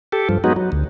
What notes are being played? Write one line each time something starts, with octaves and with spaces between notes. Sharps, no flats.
G4 A4
G2 F3
F#3 G#3 B3 D#4 F#4
F#3
D2